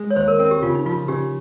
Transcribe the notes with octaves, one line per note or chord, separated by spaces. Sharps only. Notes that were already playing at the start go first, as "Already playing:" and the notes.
Already playing: G#3
C#5
D#2 C5
A#4
C4 A#4
G4
C#3 F4
D#4
F3 F4
C#3 G4